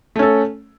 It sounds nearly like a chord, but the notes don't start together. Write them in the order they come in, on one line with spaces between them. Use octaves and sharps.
A3 C#4 A4